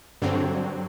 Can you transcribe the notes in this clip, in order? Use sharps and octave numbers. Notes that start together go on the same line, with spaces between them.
G2 D3 F#3 C4